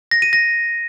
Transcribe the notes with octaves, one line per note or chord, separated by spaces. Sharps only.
A#6
D#7
A#6